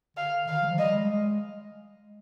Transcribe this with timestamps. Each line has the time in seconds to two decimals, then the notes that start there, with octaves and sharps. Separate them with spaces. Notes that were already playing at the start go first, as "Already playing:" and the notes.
0.17 D3 F5
0.48 D#3 F5
0.63 G3
0.71 F3
0.78 G3 D#5
0.93 G#3
1.09 G#3